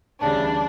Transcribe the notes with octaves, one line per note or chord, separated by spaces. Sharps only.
D2 C#3 E3 G3 D4